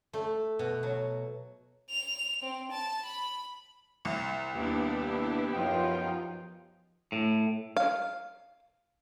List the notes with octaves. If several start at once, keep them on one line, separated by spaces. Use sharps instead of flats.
A3
B2
F#3
F7
C4
A5
B5
C2
D#2 B3 D4 E4 G4
F#2 F3 D#4 F4 G5
A2
F5